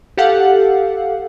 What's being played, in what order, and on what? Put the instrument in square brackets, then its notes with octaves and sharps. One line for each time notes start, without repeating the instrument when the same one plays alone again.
[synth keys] G4 A4 F5 F#5